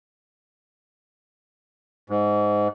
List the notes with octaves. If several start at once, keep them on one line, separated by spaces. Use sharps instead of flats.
G#2